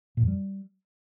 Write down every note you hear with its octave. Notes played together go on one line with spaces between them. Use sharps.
A#2
F2
G3